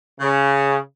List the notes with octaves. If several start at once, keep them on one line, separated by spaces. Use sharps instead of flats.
C#3